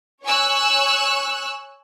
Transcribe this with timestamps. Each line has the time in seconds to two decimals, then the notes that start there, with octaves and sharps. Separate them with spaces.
0.23 C#5 G#5 C#6 E6 F#6